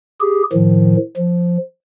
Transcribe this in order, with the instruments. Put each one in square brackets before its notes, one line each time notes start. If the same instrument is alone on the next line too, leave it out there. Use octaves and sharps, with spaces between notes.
[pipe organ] G4 G#4
A2 D#3 F3
F3